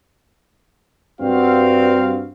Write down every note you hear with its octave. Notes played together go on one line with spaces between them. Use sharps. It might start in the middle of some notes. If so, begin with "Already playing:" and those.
G2 C4 F#4 F5